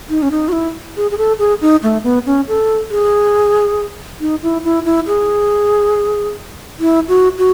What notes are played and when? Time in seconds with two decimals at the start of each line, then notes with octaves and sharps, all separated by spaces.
0.10 D#4
0.22 C#4
0.31 D#4
0.48 F#4
0.52 E4
0.97 G#4
1.11 G#4
1.18 A4
1.39 G#4
1.61 D#4
1.83 A3
2.04 B3
2.26 C#4
2.48 A4
2.91 G#4
4.20 D#4
4.43 E4
4.64 E4
4.85 E4
5.07 G#4
6.80 E4
7.08 F#4
7.38 F#4